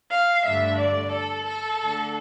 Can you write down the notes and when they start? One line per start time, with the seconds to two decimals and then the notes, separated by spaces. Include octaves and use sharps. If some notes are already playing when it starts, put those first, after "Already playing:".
0.12 F5
0.46 G2 D3 A3 D4 E5
0.79 D5
1.13 A4
1.46 A4
1.80 D3 A3 D4